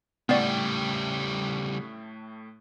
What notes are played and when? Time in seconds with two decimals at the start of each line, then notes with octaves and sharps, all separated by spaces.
0.29 A2 C#3 G3 A3 B3 D5 G5